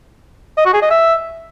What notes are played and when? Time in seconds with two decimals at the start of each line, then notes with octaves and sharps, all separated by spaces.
0.57 D#5
0.66 F#4
0.74 G#4
0.82 D#5
0.90 E5